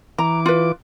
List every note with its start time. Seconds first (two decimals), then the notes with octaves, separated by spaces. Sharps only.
0.18 E3 A#5 D6
0.46 F4 B4